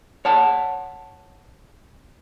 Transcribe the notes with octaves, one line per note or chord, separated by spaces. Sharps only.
C#5 F#5 A5